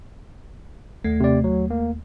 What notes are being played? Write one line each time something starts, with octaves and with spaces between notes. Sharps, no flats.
D#2 A3
C3 D5
F#3
A#3